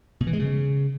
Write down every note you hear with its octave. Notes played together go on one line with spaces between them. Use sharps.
B2
E3
G#3
C#3